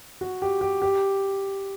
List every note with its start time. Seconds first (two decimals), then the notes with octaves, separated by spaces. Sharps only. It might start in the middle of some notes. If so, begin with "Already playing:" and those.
0.21 F#4
0.42 G4
0.61 G4
0.82 G4